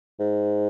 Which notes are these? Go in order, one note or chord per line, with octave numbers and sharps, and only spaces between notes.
G#2